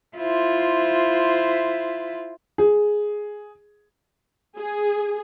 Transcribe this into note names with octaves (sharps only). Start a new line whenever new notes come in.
E4 F4 C5
G#4
G#4